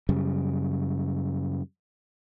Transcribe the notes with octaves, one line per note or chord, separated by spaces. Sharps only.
F#2 C#3 G3